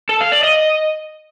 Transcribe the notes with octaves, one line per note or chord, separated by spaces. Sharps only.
A4
F5
D5
D#5